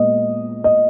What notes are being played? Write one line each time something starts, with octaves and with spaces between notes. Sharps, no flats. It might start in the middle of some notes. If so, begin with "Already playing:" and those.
Already playing: A#2 G#3 B3 D#5
D#5